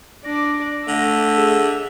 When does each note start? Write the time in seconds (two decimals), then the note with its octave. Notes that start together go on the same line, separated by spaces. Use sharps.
0.24 D4 D5 A#6
0.88 D3 A3 E5
1.37 G#4